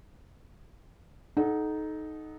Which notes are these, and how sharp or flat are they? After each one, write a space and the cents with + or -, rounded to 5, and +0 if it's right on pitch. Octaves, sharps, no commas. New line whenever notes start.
D#4 +0 A4 -30 F#5 +0